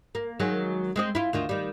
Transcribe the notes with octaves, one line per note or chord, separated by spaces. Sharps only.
A#3
D#3 F#3 G#3
G#3 C4 D#5
E4 F4
D2 D#3 F4
D#3 G3